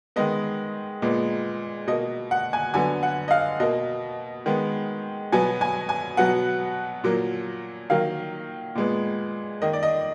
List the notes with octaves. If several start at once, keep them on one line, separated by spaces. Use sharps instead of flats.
D#3 G#3 B3 D#5
A#2 G#3 B3
B2 A#3 D#5
F#5
G#5
D3 F#3 B3 G#5
F#5
D#5
F5
B2 A#3 D#5
D#3 G#3 B3
B2 F#3 B3 G#5
G#5
G#5
B2 F#3 B3 F#5
A#2 F#3 A#3
D#3 F#3 A#3 F5
A#2 G#3 B3
D#3 A#3 D#5
D5
D#5